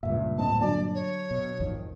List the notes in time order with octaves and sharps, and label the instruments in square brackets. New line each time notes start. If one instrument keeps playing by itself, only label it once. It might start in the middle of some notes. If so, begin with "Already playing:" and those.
[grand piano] C#2 E5 [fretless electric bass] G2 A#2
[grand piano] D1 C4 D#5 [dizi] A5
[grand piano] D3 F#3 A5 [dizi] D5
[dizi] C#5
[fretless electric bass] B2
G#1 F2 D#3